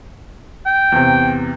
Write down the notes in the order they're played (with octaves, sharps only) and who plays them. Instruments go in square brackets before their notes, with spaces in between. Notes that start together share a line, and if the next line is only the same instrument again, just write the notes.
[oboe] G5
[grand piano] E2 C3